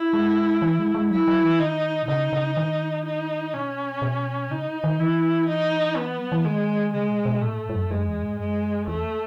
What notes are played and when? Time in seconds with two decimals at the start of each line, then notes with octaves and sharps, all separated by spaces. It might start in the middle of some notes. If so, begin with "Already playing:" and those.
Already playing: E4
0.13 G#3
0.62 E3
0.79 G#3
0.94 G#3
1.11 F#3 E4
1.28 F#3
1.44 E3
1.59 D#3 D#4
2.03 B2
2.08 C#3 D#4
2.33 C#3
2.57 D#3
3.05 D#4
3.54 B2 C#4
4.02 B2
4.50 C#3 D#4
4.84 D#3
4.99 E3 E4
5.48 D#4
5.97 B3
6.19 F#3
6.32 E3
6.45 D#3 G#3
6.93 C#3 G#3
7.09 B2
7.25 B2
7.41 A2 A3
7.58 G#2
7.69 G#2
7.75 F#2
7.91 F#2 G#3
8.07 E2
8.23 G#2
8.39 F#2 G#3
8.88 E2 A3